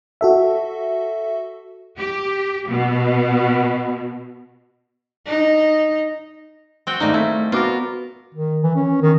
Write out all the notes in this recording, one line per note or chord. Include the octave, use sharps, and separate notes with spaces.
F#4 A4 E5
G4
B2
D#4
C4 F#4 G5
G#1 G3 A3 A#3 D#4
A3 E4
B3 F4 F#4 A#4 D6
D#3
E3
C#4
D#3